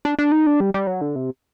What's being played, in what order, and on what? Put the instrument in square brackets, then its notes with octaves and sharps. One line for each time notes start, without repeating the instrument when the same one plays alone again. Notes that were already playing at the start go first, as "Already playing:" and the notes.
[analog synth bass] D4
D4
D#4
D4
G3
G3
F#3
D3
C3